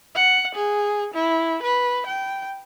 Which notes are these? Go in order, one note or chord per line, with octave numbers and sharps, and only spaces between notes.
F#5
G#4
E4
B4
G5